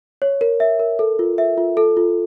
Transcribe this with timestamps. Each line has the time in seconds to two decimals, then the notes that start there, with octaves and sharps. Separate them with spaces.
0.22 C#5
0.41 A#4
0.60 E5
0.79 A#4
0.99 A4
1.19 F4
1.38 E5
1.58 F4
1.77 A4
1.97 F4